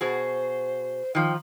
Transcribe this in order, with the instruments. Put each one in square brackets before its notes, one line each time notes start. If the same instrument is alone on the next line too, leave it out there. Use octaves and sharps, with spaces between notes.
[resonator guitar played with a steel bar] B2 F#4 G#4 [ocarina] C5
[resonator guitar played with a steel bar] D#3 F3 [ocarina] G5